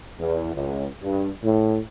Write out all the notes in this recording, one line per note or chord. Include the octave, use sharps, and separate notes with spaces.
E2
C#2
G2
A2